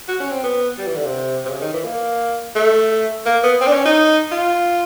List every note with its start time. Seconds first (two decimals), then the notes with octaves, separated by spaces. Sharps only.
0.08 F#4
0.20 C#4
0.31 C4
0.44 B3
0.78 G3
0.87 E3
0.96 D3
1.05 C3
1.45 C3
1.49 C#3
1.61 D#3
1.73 E3
1.84 A#3
2.55 A3
3.26 A#3
3.43 B3
3.61 C4
3.67 D4
3.73 C#4
3.85 D#4
4.32 F4